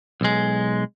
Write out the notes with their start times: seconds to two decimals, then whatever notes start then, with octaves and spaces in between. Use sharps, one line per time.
0.21 B1 G#3